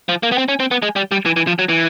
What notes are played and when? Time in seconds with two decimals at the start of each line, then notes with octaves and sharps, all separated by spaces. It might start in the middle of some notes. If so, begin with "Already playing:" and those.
0.09 F3
0.23 A#3
0.32 B3
0.38 C4
0.49 C#4
0.60 C4
0.71 B3
0.82 G#3
0.96 G3
1.11 G3
1.26 E3
1.36 E3
1.47 F3
1.59 F#3
1.69 E3